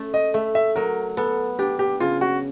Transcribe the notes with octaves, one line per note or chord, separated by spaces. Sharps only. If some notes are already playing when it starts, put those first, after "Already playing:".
Already playing: A3 C#4
D#5
A3 E5
E5
F#3 A#4
B3 A4
D4 G4
G4
C#3 F4
F#4